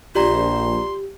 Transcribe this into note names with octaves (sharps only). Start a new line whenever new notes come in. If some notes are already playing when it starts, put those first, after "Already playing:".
A#1 F4 G4 D5 A#5 C6